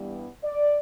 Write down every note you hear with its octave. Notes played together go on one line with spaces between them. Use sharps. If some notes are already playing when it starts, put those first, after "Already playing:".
Already playing: G2 E3 G3 B3
D5